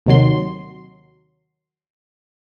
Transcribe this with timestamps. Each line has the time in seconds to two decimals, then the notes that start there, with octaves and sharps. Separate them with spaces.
0.06 D#2 C3 D#3 F#3 C6